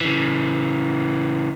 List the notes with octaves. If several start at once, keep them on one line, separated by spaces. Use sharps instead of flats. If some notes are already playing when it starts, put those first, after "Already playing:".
C#3 E3